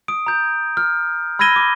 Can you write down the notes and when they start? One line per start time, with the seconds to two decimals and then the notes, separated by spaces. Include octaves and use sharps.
0.08 D#6 D7
0.27 A#5 G6
0.77 F6
1.39 B5 E6 G#6 A#6 D#7 G7
1.56 D6